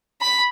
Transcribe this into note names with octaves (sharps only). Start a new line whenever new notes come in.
B5